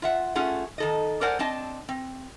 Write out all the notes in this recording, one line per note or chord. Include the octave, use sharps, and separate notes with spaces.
F4 E5 F#5
A3 C#4 F4 G#4 F#5
D#3 A4 D#5
A4 A#4 C5 D5 F#5 G#5
C4 D4 D#5 A5
C4